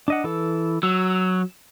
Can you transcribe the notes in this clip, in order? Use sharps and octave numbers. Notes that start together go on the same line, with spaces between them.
D4 D#5 F#5
E3 A4
F#3 E6